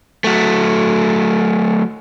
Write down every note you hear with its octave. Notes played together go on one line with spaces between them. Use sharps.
F#3 A3